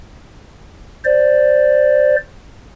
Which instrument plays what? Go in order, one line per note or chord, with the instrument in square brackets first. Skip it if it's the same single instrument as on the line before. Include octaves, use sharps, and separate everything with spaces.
[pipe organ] C5 D5